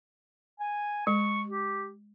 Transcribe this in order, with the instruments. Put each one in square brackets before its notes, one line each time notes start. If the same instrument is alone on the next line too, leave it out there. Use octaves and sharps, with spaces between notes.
[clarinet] G#5
[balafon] G#3 [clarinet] C#6
[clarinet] G4